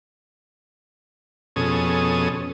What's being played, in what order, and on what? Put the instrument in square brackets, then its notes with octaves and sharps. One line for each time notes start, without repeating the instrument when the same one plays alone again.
[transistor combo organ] F2 B2 C#4 G#4 A4 D#6